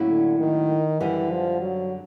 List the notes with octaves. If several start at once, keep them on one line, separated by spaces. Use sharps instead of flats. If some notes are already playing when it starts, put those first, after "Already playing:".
Already playing: A2 F#3 A#3 C#4 E4
D3
D#3
F#2 D3 E3 G3
F3
F#3